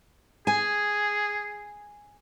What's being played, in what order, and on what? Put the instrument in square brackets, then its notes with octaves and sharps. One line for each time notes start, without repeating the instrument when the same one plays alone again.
[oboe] G#4 [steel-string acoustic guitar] G#5